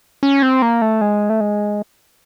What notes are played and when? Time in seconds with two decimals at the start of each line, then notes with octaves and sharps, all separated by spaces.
0.23 C#4
0.42 C4
0.62 A#3
0.82 A3
1.01 G#3
1.29 A3
1.40 G#3